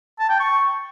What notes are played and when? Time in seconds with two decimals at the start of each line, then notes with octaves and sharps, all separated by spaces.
0.19 A5
0.29 G5
0.40 C#6